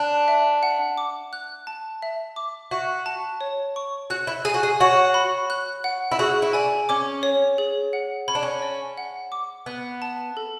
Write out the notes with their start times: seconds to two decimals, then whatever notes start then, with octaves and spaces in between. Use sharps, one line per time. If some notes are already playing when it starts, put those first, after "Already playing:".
Already playing: D4 F#6
0.28 E5
0.63 F#5
0.97 D6
1.33 F#6
1.67 A5
2.02 E5
2.36 D6
2.71 F#4 E5
3.06 A5
3.41 C#5
3.76 C#6
4.10 F#4 F#6
4.27 E4
4.45 G#4 G#5
4.54 F#4
4.63 G#4
4.80 F#4 C#5
5.14 B5
5.50 F#6
5.84 F#5
6.11 E4
6.19 F#4 G#4
6.42 E4
6.53 D4 G#5
6.89 C#4 D6
7.23 C#5
7.58 G#4
7.93 F#5
8.28 C#4 B5
8.35 D4
8.42 C#4
8.62 D5
8.98 F#5
9.32 D6
9.66 B3 F#6
10.02 A5
10.37 A4